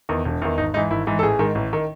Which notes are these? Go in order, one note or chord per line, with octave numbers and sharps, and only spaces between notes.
E2 D#3
E1
E2 D#3
G#1 D#4
G#2 E3 D#4
G#1 E4
G#2 E3
A4
A1 G#4
G#2 D#3
A1
D#3